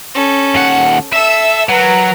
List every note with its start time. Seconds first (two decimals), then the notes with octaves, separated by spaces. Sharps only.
0.14 C#4 A4
0.55 D#2 F#5
1.13 A4 E5 E6
1.69 F#3 A#4 B4